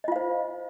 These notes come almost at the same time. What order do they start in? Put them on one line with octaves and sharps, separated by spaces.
D#5 F4 F5 C5